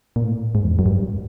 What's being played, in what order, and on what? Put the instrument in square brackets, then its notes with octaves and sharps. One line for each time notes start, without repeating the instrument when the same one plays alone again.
[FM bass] A#2
A2
G#2
E2
F2
F#2
G2